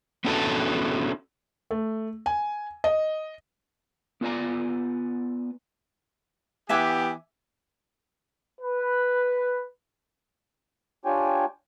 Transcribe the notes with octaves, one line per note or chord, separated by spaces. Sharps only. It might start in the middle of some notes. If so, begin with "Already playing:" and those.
B3 C#4 D4 E4 F#4 A4
A3
G#5
D#5
B3 F4 B4 D5 G#5 A#5
E3 B3 G4 E5 G#5 D6
B4
D4 F4 G4 C#5 G5 G#5